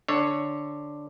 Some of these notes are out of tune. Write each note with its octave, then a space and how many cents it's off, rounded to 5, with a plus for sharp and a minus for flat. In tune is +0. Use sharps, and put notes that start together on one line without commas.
D3 +0 C#5 +0